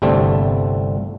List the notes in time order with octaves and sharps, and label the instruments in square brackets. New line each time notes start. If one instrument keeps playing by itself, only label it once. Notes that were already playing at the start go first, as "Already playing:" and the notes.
[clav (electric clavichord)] G1 C2 G3 A3 C4